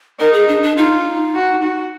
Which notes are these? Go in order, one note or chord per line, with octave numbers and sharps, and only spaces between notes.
D#4 A#4
G#4
D4
D4
D#4 F4
F#4
F#4